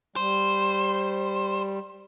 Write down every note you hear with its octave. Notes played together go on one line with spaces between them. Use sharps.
G3 C5